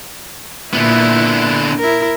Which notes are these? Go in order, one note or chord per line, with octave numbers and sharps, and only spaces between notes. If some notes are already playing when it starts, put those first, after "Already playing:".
A#2 D3 B3 E4
E4 A#4